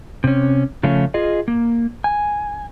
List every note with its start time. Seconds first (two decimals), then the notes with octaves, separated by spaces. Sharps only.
0.24 C3 C#4
0.83 C#3 F3 A3 C#4 F4
1.14 F4 G#4 D#5
1.48 A#3
2.04 G#5